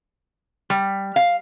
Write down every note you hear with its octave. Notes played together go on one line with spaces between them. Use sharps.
G3
F5